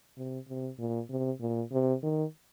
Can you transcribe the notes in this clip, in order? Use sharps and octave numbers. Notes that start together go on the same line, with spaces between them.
C3
C3
A#2
C3
A#2
C3
D#3